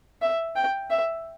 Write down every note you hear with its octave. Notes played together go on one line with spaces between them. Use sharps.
E5
G5
E5